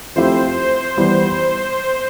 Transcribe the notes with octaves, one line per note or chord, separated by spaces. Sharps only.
F3 A3 C4 E4 G4 C5
C5
E3 G3 B3